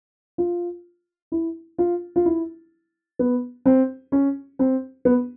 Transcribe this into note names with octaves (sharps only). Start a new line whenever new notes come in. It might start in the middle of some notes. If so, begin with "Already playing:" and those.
F4
E4
F4
F4
E4
B3
C4
C#4
C4
B3